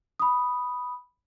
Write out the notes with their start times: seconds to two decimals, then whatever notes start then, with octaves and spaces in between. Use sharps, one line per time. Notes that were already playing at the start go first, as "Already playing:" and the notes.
0.20 B5 D#6